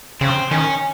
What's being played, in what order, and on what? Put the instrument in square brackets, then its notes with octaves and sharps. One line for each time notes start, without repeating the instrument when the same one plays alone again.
[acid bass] C#3 [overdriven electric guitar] C4
[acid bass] D#3 [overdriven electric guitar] C#4